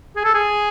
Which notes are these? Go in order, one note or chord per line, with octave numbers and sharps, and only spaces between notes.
G#4
A4
G#4